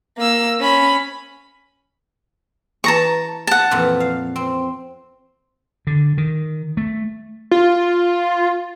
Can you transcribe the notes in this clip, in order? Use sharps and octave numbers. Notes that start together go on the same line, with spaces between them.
A#3 E6
C#4 B5
E3 A5 A#5 C#6
F#5 A5
F2 A#2 E3
F5
C4
D3
D#3
A3
F4